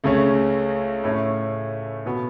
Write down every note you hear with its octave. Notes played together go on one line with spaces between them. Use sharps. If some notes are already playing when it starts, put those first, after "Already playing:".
C#2 C#3 A3 C#4
A2 A3 C#4
B2 B3